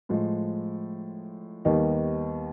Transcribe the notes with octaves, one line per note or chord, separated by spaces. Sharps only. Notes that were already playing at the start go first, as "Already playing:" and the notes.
A2 F3 G#3
D#2 D#3 G3 B3 D#4